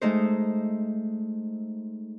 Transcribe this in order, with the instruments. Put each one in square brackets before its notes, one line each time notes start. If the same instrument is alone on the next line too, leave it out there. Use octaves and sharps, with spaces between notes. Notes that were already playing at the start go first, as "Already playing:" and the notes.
[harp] G#3 A3 D#4 C5